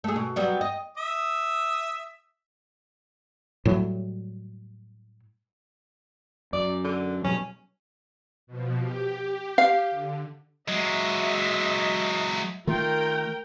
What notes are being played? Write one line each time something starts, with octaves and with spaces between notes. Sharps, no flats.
A3 G#4
B2
F#3 G3 B3
D#5
E5 D#6
A2 F#3 G3
F#2 D5
D3
B2 F#3 G3 C#4
B2 F3
G4
F5
D3
F#3 G#3 D#5 E5
D#3 A3 F4 A#4 G5